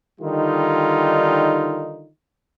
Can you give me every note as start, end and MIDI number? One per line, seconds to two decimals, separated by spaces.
0.20 2.07 50
0.20 2.07 51
0.20 2.07 55
0.20 2.07 63
0.20 2.07 65